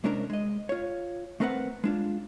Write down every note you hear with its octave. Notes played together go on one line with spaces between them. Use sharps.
C2 G#3 C#4 D4 A#4 A#5
G#3 D#5
F4 C#5
A3 C4 A#4 B4 D5 F#5
G#3 D4 F4